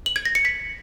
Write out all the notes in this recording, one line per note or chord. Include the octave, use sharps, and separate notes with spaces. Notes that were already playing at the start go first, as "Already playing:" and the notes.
F#7
G#6
A#6
C#7
B6